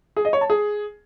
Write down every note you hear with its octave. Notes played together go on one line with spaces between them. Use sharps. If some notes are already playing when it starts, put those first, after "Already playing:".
G#4
D#5
C#5
A5
G#4